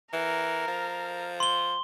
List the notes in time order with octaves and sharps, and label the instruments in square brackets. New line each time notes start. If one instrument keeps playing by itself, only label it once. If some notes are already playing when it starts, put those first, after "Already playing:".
[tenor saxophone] E3 [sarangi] A#4
[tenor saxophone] F3
[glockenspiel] C6 G7